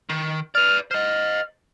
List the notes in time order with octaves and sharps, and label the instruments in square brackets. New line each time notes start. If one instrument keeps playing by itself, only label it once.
[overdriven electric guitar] D#3
[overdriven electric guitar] B4 D5 [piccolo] F6
[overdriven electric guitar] C5 D#5 [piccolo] F6